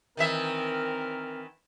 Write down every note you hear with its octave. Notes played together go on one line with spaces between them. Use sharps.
D#3 E3 C4 A#4 E5